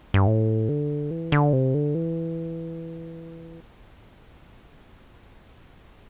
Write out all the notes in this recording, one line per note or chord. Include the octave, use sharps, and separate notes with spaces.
G2
A2
D3
E3
D3
C3
D3
E3